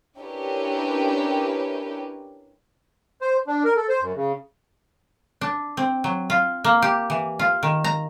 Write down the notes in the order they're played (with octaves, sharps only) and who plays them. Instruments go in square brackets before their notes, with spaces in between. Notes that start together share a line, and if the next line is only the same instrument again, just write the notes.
[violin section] C#4 D4 E4 G4 A#4 B4
[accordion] C5
D4
A#4
A4
C5
F#2
C#3
[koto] D4
C4
F#3
F4
A#3
G4
E3
F4
D#3
A#5